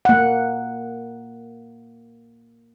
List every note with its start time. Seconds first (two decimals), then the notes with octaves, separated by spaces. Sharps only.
0.05 A#3 F#5